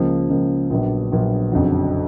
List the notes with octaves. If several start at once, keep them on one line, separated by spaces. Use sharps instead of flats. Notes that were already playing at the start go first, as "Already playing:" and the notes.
Already playing: C#2 C#3 F3 A#3
C#2 C#3 F3 A#3
A#1 A#2 F#3 B3 D4
A#1 A#2 F#3 B3 D4
F#1 F2 D3 F#3